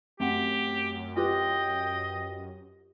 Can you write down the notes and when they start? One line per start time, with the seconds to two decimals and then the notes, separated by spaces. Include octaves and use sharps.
0.20 F#2 A3 C4 G4 F#5
1.17 F4 G4 B4 D#5 G5